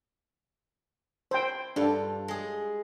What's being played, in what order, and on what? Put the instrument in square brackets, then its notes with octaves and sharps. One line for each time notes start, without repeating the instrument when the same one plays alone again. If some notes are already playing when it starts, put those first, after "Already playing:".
[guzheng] E4 [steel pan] C5 G5
[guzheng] G2 F4 [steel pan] D4 A4
[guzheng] G#3 G#4